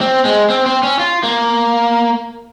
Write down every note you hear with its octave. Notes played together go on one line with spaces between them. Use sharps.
C4
G#3
C4
C4
C#4
F4
A#3